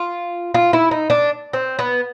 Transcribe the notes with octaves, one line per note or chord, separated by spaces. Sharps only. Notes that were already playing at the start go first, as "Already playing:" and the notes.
Already playing: F4
F4
E4
D#4
D4
C4
B3